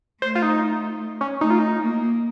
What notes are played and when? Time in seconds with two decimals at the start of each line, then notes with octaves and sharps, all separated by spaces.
0.22 A3 C5
0.35 F4
0.42 D#4
1.21 C#4
1.41 A3 D#4
1.50 F4
1.59 D#4
1.81 A#3